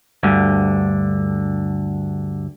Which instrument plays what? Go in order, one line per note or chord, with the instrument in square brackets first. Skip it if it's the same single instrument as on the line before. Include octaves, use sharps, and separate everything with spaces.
[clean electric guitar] D2 G2 D3